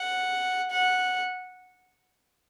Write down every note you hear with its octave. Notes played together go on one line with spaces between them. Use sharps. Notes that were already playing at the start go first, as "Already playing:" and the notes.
Already playing: F#5
F#5